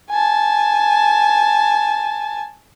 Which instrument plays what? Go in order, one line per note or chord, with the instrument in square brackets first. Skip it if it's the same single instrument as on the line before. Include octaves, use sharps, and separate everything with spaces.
[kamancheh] G#5 A5